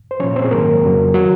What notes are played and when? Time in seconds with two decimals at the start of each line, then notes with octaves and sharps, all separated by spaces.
0.11 C5
0.20 A#2 F3 C#4 C#5
0.36 C4 C5
0.44 G#4
0.51 G#2 D#3 F#3 A#3 A#4
0.83 F2 C#3 F#3
1.14 D#3 F#3 F#4